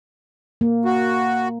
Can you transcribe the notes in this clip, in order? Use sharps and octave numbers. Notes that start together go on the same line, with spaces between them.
A#3
F#4